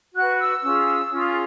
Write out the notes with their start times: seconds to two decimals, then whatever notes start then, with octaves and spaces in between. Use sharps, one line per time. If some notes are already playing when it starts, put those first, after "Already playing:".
0.14 F#4 B4 F#6
0.39 E6
0.63 C#4 F4 G#4
1.10 C#4 F4 G#4